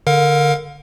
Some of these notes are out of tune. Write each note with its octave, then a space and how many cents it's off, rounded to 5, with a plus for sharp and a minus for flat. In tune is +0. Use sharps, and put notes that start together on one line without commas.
D3 +0 A#4 +0 F5 +35